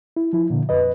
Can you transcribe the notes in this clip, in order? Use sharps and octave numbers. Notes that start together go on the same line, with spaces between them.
E4
F3 E4
A#2 D3
F2 B4 D#5